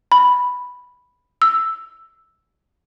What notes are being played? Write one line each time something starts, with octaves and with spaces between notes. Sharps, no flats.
B5
E6